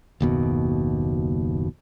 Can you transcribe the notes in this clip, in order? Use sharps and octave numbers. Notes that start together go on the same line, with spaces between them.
F#1 D#2 B2